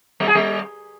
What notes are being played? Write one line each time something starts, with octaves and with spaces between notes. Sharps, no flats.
G3
G#4
G3